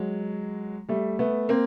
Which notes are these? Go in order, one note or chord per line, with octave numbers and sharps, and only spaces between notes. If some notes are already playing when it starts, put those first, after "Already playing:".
Already playing: F#3 G#3
G3 A3
A3 B3
A#3 C4